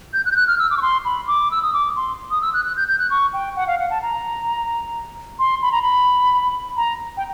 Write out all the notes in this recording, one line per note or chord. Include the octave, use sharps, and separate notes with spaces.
G6
F#6
G6
F#6
F6
E6
D6
C#6
C6
B5
D6
E6
D#6
D6
C6
D#6
E6
F#6
F#6
G6
G6
F#6
C#6
G5
F#5
F5
F#5
A5
A#5
C6
B5
A#5
B5
A#5
G5